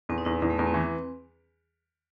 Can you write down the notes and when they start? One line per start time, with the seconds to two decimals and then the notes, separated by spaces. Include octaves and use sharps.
0.09 E2 C4
0.18 D#4
0.25 E2 E4
0.42 E2
0.50 A3
0.58 E2 B3
0.67 C4
0.74 E3